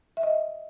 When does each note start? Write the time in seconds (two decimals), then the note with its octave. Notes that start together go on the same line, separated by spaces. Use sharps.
0.17 E5
0.23 D#5